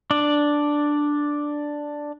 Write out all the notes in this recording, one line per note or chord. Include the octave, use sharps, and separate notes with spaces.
D4 D5